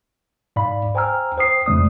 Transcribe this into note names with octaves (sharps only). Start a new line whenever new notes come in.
G#2 D5 F5 B5
C5 G5 G#5 A#5 E6 F6
C5 G5 D#6 C7
F2 C#3 G#3 A3 D5 D#6